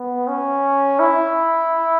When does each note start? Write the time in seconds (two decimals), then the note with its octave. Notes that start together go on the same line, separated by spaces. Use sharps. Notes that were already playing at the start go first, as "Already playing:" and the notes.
Already playing: B3
0.28 C#4
1.00 E4